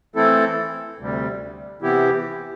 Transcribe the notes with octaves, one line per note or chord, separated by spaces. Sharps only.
E3 A3 C4 E4 A4
D2 C3 G3
C3 E3 B3 E4 G4